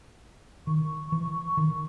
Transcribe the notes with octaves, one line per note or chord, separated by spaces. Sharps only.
D#3 C#6
E3
D#3